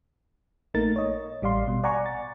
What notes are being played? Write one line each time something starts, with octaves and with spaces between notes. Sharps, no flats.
A#1 A3 A#3 D#4 A#4 A6
C#5 D#5
A1 G3 D5 F5 C6
B2
D5 F#5 G#5 A#5 C#6
A6